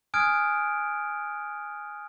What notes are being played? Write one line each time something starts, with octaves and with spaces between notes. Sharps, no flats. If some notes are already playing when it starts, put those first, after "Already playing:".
G#5 D#6 F6 F#6 G#6 D7